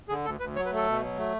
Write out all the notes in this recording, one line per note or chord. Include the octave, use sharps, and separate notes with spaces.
D3 G#4
D2 A4
D2 B4
F#3 C#5
B4
A3 A4
B2
F#3
A3